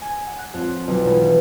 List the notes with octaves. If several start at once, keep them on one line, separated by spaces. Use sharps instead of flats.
G#5
F#5
F#6
F2
B1
E1
E3